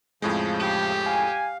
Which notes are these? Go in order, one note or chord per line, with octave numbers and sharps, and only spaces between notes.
F2 A2 C#3 F3 G#3 G6
G4
F5 G#5